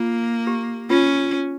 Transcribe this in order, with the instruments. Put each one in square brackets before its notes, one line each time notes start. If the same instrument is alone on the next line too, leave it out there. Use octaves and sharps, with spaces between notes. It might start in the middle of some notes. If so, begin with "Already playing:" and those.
Already playing: [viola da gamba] A#3 [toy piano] F4
[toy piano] G4
[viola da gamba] C#4 [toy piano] F4